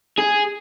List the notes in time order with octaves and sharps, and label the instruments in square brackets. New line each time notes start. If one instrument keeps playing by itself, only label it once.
[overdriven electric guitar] G#4